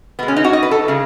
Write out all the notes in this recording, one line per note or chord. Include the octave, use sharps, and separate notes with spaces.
B2 G#3 B3
C#4
D#4
F#4
D#5
B4
A4
C#3 G#3